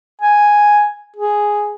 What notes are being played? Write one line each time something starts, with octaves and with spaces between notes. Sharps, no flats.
G#5
G#4